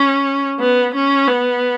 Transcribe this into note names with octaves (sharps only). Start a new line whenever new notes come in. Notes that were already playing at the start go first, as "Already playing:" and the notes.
Already playing: C#4
B3
C#4
B3